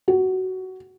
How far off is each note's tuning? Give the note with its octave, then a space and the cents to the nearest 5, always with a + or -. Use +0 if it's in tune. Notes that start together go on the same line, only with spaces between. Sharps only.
F#4 +15